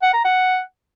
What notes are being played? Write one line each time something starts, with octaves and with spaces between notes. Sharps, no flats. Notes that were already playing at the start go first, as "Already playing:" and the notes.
F#5
A#5
F#5